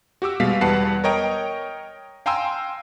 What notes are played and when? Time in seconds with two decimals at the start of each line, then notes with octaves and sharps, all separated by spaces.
0.22 F#4 G4 D6 E6
0.40 B2 G3 G#3 F5 B6
0.61 E2 G3 B4 F#5 A5 C7
1.04 A#4 C#5 D#5 G5 A#5
2.26 F5 G5 G#5 A#5 C6 E6